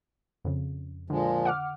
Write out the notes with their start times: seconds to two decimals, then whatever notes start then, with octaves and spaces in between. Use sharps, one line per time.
0.44 F2 C#3
1.10 A#2 D3 F3 G#3
1.45 F#5 D6 F6